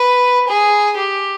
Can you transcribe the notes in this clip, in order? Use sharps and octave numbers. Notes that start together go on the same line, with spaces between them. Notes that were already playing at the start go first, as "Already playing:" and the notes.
Already playing: B4
G#4
G4